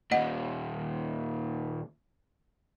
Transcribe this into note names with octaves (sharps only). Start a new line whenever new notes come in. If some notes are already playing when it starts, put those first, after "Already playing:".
D#2 A#2 D#5 F#5